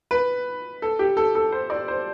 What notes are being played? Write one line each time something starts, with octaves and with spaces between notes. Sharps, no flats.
B4
A4
G4
A4
A4
C5
D5
C5